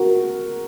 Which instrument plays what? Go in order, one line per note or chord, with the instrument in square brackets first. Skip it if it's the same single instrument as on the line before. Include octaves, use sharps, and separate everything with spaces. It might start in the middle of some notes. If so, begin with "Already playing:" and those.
Already playing: [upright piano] F#4 A#4